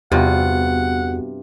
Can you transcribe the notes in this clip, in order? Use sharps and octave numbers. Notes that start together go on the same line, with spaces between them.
E2 G2 C3 B3 F4 F#4 F#5